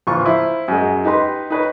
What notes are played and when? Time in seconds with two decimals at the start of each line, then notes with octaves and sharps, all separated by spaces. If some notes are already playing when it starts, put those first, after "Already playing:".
0.07 A#1 E3 F4 C#6
0.25 F3 E4
0.68 F#2 G#3
1.05 D#4 G4 B4 C6
1.50 D#4 B4 C#5